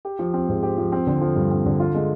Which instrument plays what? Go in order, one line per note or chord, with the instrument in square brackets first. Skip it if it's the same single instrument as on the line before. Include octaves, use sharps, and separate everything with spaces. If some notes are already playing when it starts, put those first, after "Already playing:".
[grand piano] G4
F3
C4
G#2
G4
F3
C4
D3
F3
G2
C4
D3
F4
G#3